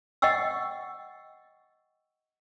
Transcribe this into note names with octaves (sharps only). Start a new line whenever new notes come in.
D#5 F#5 G5 C#6 E6